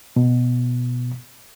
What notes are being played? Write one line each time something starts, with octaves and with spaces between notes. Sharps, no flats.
B2